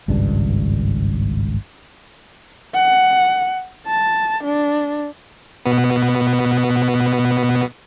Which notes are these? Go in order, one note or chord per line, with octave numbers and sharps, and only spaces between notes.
G#1 C#2 G2 D4
F#5
A5
D4
B2 B3